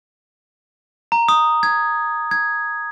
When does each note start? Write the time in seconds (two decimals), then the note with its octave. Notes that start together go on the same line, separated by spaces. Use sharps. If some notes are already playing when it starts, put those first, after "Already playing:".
1.12 A#5
1.28 D#6
1.63 G#6
2.31 G#6